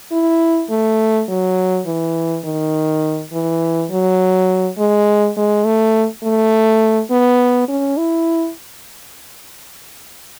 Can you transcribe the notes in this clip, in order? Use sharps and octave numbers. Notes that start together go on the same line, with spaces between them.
E4
A3
F#3
E3
D#3
E3
F#3
G#3
G#3
A3
A3
B3
C#4
E4